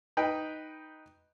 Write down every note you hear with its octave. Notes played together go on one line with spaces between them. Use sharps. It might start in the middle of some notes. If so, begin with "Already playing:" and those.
D#4 B4 G5